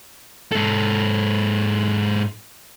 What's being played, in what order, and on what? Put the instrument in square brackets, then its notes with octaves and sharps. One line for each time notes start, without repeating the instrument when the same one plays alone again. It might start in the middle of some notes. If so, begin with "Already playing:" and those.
[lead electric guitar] G#2 A4